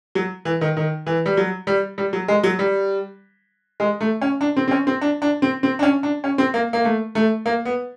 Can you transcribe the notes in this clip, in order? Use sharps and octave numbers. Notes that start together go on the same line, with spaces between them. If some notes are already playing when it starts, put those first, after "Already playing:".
F#3
E3
D#3
D#3
E3
G3
F#3
G3
G3
F#3
G#3
F#3
G3
G#3
A3
C#4
D4
C4
C4
C#4
C4
D4
D4
C4
C4
D4
C#4
D4
C#4
C4
A#3
A#3
A3
A3
A#3
B3